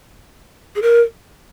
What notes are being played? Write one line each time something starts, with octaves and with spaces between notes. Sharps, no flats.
G#4
A#4